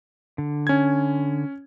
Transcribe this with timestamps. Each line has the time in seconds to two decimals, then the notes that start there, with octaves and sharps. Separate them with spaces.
0.38 D3
0.67 C#4 G#6